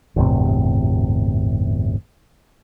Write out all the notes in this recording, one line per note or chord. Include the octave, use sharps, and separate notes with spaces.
G1 E2 A2 C3